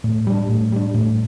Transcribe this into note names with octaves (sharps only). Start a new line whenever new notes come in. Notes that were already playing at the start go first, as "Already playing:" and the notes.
A2
G3 D4
A2
G3 D4
A2